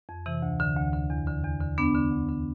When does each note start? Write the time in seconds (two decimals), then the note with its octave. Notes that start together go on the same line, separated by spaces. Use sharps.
0.09 F2
0.26 C3 E3
0.42 D2
0.60 D3
0.76 D2
0.94 D3
1.10 E2
1.27 D3
1.44 E2
1.61 D3
1.78 D2 B3 D4
1.95 D3
2.11 D2
2.29 D3